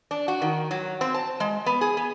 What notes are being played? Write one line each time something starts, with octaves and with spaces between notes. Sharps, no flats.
D4
F#4
D#3
F#3
C4
A5
G#3
B3
G#4
B3